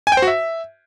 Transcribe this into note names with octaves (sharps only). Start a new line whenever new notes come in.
G#5
G5
C5
F#4
E5